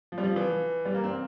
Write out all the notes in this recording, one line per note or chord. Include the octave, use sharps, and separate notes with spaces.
F3
G3
F3
E3
G3
A#3
C4